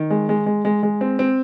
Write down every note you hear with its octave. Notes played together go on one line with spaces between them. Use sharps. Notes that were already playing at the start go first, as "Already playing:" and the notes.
Already playing: D#3
G#3
G#3
G#3
G#3
G#3
C4
C4